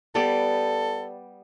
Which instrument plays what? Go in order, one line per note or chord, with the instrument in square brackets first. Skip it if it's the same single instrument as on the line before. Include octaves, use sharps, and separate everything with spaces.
[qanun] G3 B3 D5 [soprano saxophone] A4